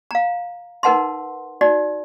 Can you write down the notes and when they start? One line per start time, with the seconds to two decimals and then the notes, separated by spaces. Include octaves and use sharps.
0.11 F5 A#5
0.83 D#4 A#4 B4 F#5 A5 C6
1.61 D#4 F#4 D5